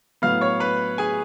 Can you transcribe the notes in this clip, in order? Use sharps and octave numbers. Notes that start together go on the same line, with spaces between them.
A2 F#3 B3 F5 F6
C#5 C#6
B4 B5
G#4 G#5